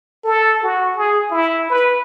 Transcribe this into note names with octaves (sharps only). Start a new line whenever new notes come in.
A4
F#4
G#4
E4
B4